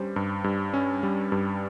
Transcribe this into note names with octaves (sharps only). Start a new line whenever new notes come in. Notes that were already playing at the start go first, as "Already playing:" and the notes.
Already playing: G2 G3 C#4 C5
G2
G2
C#4
G3
G2